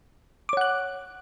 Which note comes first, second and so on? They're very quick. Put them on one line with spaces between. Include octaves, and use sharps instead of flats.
D6 C#5 F#5 F#6